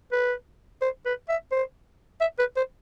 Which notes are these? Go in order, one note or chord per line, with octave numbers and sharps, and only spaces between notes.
B4
C5
B4
E5
C5
E5
B4
C5